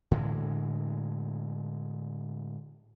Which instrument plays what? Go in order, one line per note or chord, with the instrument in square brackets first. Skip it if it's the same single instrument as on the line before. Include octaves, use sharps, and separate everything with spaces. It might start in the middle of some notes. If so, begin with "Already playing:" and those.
[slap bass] A2 D3 E3 G#3